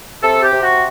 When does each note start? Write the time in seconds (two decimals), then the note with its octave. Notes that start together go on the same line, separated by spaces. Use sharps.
0.23 C3 A4
0.43 G4
0.53 C3
0.62 F#4